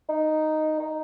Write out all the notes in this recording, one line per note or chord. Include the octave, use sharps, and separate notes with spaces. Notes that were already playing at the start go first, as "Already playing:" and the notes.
D#4
D#4